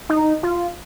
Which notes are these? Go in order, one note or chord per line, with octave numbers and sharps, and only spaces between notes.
D#4
F4